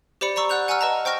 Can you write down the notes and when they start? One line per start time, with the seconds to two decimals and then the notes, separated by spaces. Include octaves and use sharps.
0.21 G4 C5 D5 B5 C#7
0.36 D5 A#5 C#6 E6
0.49 D5 F#5 F#6 G6 F7
0.68 F#5 G#5 A#5 C#6 E6 F6
0.81 B4 D#5 A5 A#5
1.05 C5 G5 C#6 F6 A#6